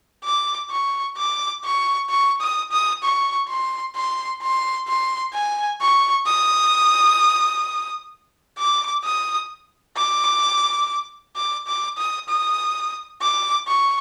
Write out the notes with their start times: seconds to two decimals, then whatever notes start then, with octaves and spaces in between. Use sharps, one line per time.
0.24 D6
0.70 C#6
1.17 D6
1.64 C#6
2.10 C#6
2.41 D#6
2.71 D#6
3.03 C#6
3.48 C6
3.96 C6
4.42 C6
4.87 C6
5.33 G#5
5.81 C#6
6.26 D#6
8.58 D6
9.04 D#6
9.97 D6
11.36 D6
11.67 D6
11.98 D#6
12.29 D#6
13.21 D6
13.68 C#6